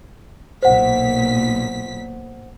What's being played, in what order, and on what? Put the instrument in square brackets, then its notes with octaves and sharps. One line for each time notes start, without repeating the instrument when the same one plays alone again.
[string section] B1 A#2 B6 [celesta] C5 F#5